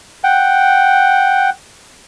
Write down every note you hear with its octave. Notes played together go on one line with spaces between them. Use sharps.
F#5 G5